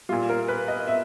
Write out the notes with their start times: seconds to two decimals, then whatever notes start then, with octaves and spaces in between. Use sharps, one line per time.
0.09 G3 F4
0.12 A#2
0.29 A#4
0.48 B4
0.68 D#5
0.87 E5